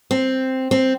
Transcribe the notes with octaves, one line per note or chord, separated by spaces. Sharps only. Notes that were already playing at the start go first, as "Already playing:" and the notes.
C4
C4